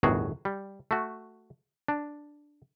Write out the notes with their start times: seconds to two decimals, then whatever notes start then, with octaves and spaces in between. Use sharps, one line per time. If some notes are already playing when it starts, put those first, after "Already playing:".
0.03 G1 E2 A2 D#3 F#4 G#4
0.45 G3
0.91 A3 F#4
1.88 D4